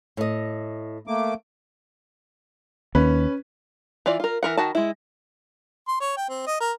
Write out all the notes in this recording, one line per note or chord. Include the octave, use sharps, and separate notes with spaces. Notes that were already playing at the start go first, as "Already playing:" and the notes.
A2 D#5
A3 A#3 D6
D#2 C#4 B4
E3 F4 D5
F4 A#4
E3 A#4 F#5
D#3 F#4 A5
G#3 E4
C6
C#5
G5
C4
D#5
A#4